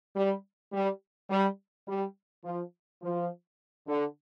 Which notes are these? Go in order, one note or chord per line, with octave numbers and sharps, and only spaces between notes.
G3
G3
G3
G3
F3
F3
D3